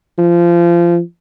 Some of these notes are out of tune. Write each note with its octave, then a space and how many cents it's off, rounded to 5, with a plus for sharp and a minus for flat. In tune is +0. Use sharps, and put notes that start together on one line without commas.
F3 -25